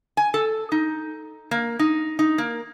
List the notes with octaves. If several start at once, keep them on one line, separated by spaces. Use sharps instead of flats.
G#5
A4
D#4
A#3
D#4
D#4
A#3